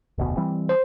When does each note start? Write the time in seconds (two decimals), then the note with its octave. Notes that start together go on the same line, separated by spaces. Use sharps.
0.18 F1 D2 B2
0.37 E3 G3 C4
0.69 C5